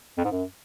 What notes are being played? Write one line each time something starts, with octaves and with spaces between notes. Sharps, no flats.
F2
G#2
F#2